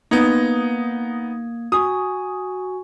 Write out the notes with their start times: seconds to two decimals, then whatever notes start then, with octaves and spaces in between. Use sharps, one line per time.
0.11 A#3 B3 D#4 D#6 G#6
1.72 F#4 G#5 C#6 D#6